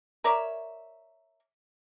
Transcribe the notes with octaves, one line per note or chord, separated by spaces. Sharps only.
A#4 C#5 D5 E5